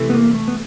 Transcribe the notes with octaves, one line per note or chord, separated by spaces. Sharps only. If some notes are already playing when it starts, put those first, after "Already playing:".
Already playing: C3 E3 A3
B3
A#3
A3
B3